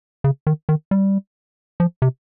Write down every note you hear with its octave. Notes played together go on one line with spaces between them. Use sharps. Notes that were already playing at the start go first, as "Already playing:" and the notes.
C#3
D#3
D#3
G3
F3
C3